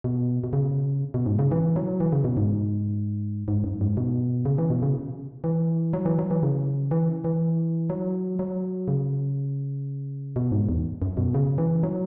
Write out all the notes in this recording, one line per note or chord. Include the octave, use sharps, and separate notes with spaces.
B2
B2
C#3
B2
G#2
C#3
E3
F#3
E3
C#3
B2
G#2
G#2
F#2
G#2
B2
C#3
E3
B2
C#3
E3
F#3
E3
F#3
E3
C#3
E3
E3
F#3
F#3
C#3
B2
G#2
E2
F#2
B2
C#3
E3
F#3